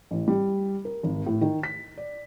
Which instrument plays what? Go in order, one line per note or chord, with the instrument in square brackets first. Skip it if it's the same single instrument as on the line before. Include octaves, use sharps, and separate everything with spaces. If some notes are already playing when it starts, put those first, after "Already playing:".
[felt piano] A1
G3
A#4
G#1
A2
D#3
B6
D5